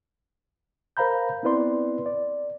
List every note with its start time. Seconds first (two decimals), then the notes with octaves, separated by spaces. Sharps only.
0.97 A#4 C5 F5 A#5 B5 G6
1.43 B3 C4 E4 B4 D5 C6
2.06 D5